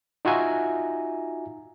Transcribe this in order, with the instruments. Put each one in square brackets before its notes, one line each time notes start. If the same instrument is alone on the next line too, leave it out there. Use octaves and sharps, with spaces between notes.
[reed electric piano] D#4 F4 F#4 E5 G#5 A#5